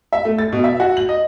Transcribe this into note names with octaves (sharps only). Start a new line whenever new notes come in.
E5
A3
A6
B2
E5
F#4
F#7
D#5